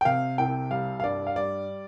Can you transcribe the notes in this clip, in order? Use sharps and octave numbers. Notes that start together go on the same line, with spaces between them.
G5
C3 F5
C2 G5
G3 F5
F5
G2 D5
F5
G3 D5